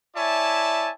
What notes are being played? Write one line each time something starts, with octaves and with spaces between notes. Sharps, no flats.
E4 C#5 D5 E5 G#5 A5